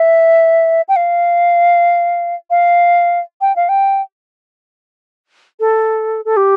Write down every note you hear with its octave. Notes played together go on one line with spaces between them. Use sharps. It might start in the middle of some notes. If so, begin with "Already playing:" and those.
Already playing: E5
G5
F5
F5
G5
F5
G5
A4
A4
G4